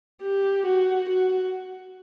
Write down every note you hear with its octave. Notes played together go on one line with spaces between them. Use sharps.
G4
F#4
F#4